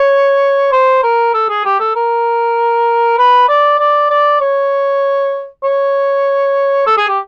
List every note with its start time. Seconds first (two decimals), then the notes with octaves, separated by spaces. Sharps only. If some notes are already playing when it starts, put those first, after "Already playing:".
Already playing: C#5
0.72 C5
1.03 A#4
1.34 A4
1.49 G#4
1.65 G4
1.80 A4
1.96 A#4
3.18 B4
3.49 D5
3.79 D5
4.10 D5
4.41 C#5
5.64 C#5
6.87 A4
6.97 G#4
7.08 G4